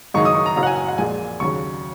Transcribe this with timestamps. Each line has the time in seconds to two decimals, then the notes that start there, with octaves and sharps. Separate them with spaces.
0.14 F#1 F#2 D#3 G#3 D#4 C#6
0.25 D#6
0.35 C#6
0.46 A#5
0.56 F#1 F#2 F#3 A#5
0.63 F#5
0.67 G#5
0.78 G#5
0.88 F#5
0.98 A#1 A#2 G#3 G#5
1.40 D#2 C#3 F#3 C#6